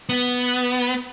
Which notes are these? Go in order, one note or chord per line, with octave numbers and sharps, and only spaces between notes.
B3